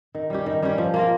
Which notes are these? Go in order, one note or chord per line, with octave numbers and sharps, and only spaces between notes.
D#3
G3 C#4 G4
D#3
G3 C#4 G4
F3
A#3 F4 A#4